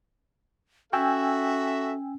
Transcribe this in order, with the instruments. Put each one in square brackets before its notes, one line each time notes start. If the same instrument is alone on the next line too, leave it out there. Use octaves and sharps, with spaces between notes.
[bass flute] C#4 [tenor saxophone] F#4 [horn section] A4 E5 [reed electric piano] G5 G#5 E6